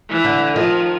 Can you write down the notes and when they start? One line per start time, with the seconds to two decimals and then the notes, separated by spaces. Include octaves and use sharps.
0.09 E3
0.25 D3
0.56 D#3 F3